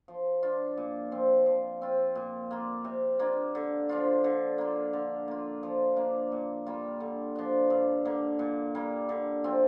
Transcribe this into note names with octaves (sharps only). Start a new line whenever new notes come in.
F3
D4 F4
A#2
F3 C4
F3
C4 F4
A#2
A#3 F4
C3
A#3 D4 F4
D3
F3 D4 F4
D3
A#3 F4
D3
A#3 F4
F3
A#3 D4
A#2
G3 A#3 F4
D3
F3 D4
G2
D3 A#3
A#2
G3 A#3
D3
F3 C4 F4